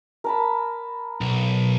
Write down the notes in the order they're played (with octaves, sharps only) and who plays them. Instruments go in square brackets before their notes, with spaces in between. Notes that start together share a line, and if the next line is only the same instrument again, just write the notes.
[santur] A#4 A5 B5
[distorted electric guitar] B1